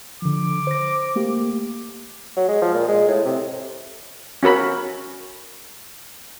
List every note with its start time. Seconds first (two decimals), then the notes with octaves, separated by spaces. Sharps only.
0.22 D3 F3 D6
0.67 C5 A#6
1.16 A3 A#3 G4
2.36 F#3
2.48 G#3
2.61 F3
2.74 A#2
2.88 G#3
3.08 A2
3.25 C3
4.43 C#4 F#4 A#4 B5